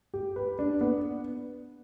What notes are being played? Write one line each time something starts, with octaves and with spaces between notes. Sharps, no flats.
G4
B4
D4
B3